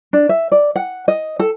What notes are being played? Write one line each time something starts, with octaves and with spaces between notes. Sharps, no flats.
D4
E5
D5
F#5
D#5
A4